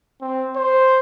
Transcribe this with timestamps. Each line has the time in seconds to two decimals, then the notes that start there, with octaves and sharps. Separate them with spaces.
0.21 C4
0.56 C5